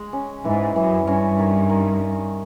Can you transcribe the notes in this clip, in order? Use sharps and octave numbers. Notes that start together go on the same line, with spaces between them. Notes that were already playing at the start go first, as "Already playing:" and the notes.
Already playing: G#3
C#4
G#2 E3
F#2 E3
G2 C#4
D#3
D#3